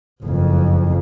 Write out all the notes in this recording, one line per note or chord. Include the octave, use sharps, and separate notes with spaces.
F#1 F2